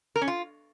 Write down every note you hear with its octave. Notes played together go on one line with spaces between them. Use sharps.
A#4
C#4
F4